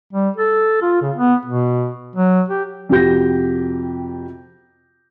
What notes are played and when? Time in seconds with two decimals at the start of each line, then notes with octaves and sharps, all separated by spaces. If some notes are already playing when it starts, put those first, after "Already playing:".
0.13 G3
0.37 A4
0.82 F4
1.02 C#3
1.16 B3
1.45 B2
2.16 F#3
2.49 G4
2.89 F2 C3 F#4 G4 G6 A#6